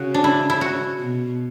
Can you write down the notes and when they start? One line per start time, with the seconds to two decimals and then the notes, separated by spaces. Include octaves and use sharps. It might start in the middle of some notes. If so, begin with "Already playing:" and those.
Already playing: C#3 F#4
0.14 D4
0.24 E4
0.50 E4
0.61 F#4
0.98 B2